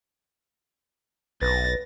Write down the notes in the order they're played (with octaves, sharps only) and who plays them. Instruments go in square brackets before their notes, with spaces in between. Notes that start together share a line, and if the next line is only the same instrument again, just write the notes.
[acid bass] B1 [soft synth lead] B4 [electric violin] A6 A#6